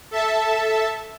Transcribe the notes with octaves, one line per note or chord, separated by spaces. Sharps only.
A4 E5 A5